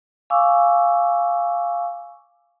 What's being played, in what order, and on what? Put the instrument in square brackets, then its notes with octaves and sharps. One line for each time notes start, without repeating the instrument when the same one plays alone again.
[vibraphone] F5 G#5 C#6 D6 E6